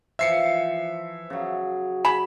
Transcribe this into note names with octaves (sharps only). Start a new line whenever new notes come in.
E3 F3 E5 C7 C#7
C#3 F#3
G#4 B5 E7